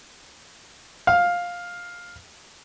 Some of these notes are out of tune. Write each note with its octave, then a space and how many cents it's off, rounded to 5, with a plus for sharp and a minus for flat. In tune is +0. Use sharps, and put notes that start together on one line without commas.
F5 +10